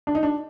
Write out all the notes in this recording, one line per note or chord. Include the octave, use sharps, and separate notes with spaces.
D4
D#4
D4